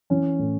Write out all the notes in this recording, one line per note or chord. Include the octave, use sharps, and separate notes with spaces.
E3 C#4
A2